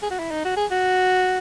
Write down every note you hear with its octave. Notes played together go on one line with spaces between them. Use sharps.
G#4
F#4
E4
D#4
F#4
G#4
F#4